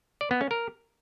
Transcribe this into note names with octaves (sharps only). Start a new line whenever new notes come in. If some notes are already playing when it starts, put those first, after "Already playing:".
D5
B3
C#4
A#4